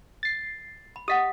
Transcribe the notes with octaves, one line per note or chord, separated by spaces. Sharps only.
A6 C7
B5
G4 D#5 F#5 D#6 B6